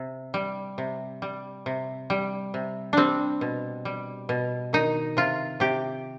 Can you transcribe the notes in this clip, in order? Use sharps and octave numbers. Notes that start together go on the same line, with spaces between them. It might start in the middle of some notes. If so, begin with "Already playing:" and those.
Already playing: C3
G3
C3
G3
C3
G3
C3
G3 C4 D4
B2
G3
B2
D#3 D#4
C3 F4
C3 G4